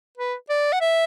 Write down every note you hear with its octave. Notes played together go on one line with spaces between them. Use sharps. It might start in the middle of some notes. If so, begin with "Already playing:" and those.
B4
D5
F#5
E5